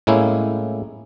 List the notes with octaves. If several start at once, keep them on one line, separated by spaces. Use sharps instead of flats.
A2 G#3 A#3 C#4 E4